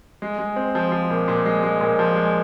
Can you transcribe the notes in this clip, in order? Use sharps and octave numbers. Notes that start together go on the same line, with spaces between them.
G#3
G#3
C4
F3
F3
A#2
A#2
G#3
G#3
A#2
F3
G#3